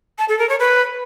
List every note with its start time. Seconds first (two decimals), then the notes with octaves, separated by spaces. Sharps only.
0.18 A5
0.29 A4
0.39 A#4
0.49 C#5
0.60 B4